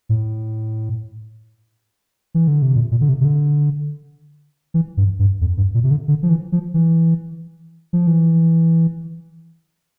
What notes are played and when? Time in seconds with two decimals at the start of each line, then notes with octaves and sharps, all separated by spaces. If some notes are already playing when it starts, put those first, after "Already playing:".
0.09 A2
2.34 E3
2.48 D3
2.62 C3
2.75 A#2
2.91 A#2
3.01 D3
3.09 C3
3.21 C3
3.25 D3
4.74 E3
4.97 G2
5.19 G2
5.41 F2
5.57 G2
5.74 A#2
5.84 C3
5.91 D3
6.08 D3
6.23 F3
6.29 E3
6.52 F3
6.74 E3
7.93 F3
8.07 E3